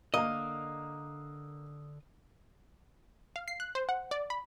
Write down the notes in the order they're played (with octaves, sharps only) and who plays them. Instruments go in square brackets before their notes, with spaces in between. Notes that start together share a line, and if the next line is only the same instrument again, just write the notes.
[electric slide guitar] D3 [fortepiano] A#3 A#4 [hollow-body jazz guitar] D#5 [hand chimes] D#6
[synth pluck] F5
C7
F#6
C5
F#5
D5
B5